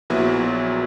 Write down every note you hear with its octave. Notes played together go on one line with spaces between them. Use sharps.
A#1 A#2 F#3 B3 E4